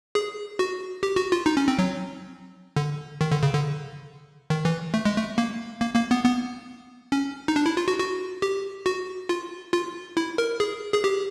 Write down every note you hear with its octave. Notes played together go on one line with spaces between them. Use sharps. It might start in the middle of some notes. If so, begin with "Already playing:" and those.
G#4
F#4
G4
F#4
F4
D#4
C#4
C4
F#3
D3
D#3
D3
C#3
D3
D#3
E3
A3
G#3
A3
A#3
A#3
A#3
B3
B3
C#4
D#4
D4
E4
F4
F#4
F#4
G4
F#4
F4
F4
E4
A#4
G#4
G#4
G4